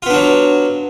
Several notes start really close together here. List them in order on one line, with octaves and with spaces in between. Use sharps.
F4 B3 D4 F#3